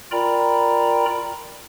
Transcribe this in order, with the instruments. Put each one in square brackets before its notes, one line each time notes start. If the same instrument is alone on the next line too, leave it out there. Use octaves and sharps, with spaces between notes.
[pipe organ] F4 A#4 D5 G5 A#5 B5